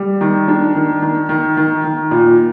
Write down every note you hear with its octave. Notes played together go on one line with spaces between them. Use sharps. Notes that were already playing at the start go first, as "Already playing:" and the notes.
Already playing: G3
D#3
D4
D#3
D#3
D#3
D#3
D#3
A#2